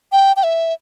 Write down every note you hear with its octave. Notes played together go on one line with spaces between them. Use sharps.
G5
G5
E5